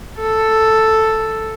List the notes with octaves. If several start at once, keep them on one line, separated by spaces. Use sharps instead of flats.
A4